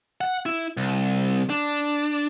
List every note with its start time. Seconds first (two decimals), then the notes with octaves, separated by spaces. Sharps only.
0.21 F#5
0.46 E4
0.77 C2
1.50 D4